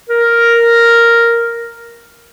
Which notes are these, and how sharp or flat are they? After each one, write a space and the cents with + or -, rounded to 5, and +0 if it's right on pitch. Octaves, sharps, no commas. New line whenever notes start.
A#4 +0